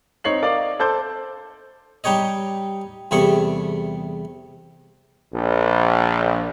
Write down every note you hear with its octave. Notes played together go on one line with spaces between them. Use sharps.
C4 D#4 C#5 C7 F#7
A#4 D5 D#5 F5 D6
A4 C5 A5 D6 G6
G3 D#4 G4 C#5 D#5
E2 C3 G3 G#4 A4 C#6
A#1